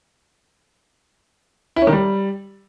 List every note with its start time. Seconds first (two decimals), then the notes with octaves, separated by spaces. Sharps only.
1.76 E4
1.82 C#4
1.87 D#3
1.93 G3